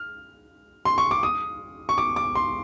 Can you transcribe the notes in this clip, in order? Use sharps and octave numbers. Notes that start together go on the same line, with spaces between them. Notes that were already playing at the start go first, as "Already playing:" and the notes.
Already playing: F6
C6
C#6
D6
D#6
C#6
D6
D6
C6